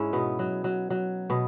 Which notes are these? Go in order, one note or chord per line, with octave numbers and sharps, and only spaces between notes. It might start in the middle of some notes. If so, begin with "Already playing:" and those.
Already playing: G#2 G#3 C#4 E4
B2 B3
F#3
F#3
F#3
B2 B3